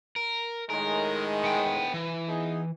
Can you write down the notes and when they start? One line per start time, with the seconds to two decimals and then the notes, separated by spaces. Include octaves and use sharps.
0.16 A#4
0.70 A2 D#3 G#3 A#4
1.44 B3 G5
1.94 E3
2.28 B3 D#4 G#4